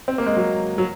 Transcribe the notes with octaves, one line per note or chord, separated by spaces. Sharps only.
C4
A#3
G#3
F#3
F#3